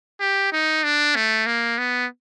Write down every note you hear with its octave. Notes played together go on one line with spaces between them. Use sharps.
G4
D#4
D4
A3
A#3
B3